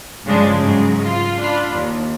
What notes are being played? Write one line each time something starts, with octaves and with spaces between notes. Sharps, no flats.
G2 C#3 F3 G#3 D4
G#2 C#3 F#3 G#3
F4
D4 F4 B5
D#2